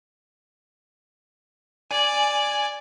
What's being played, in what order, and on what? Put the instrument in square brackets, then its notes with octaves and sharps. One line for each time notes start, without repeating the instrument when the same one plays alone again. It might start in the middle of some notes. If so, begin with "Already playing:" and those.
[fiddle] D5 [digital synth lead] G#5